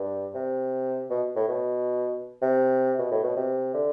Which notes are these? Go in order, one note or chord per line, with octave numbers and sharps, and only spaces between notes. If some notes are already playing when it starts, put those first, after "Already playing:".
Already playing: G2
C3
B2
A2
B2
C3
B2
A2
B2
C3
D3